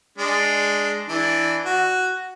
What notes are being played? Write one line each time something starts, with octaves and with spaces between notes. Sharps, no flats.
G#3 D4
E3 D4
F#4